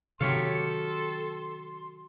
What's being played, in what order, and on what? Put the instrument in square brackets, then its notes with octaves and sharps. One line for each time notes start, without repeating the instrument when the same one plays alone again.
[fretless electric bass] C3 D#3 F#3 [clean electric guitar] G4 C#5 F5 [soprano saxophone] A4 [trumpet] C6